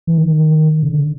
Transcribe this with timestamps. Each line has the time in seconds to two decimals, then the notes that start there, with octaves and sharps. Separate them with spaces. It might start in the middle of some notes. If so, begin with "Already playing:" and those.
0.07 E3
0.18 D#3
0.83 C#3
0.90 D3